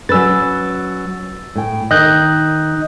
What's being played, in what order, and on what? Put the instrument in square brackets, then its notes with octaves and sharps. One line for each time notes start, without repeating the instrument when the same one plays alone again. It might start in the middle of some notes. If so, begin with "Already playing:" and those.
[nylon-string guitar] F#3 C#4 B4 [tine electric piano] E6 A6
[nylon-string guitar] A2 G5
[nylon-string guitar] D#3 A#4 [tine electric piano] D#5 F#6 G6